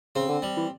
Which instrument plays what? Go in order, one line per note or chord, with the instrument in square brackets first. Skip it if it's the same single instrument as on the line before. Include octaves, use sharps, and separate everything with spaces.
[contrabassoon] C#3 [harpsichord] C4
[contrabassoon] D3
[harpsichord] G3
[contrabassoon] E3